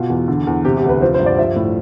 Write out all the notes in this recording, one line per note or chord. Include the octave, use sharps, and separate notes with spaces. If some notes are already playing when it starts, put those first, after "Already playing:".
Already playing: B2 F4
E2
D3
E2
C3 G4
G4
D2
B4
F3 C5
C5
G2
D5
F3 E5
A2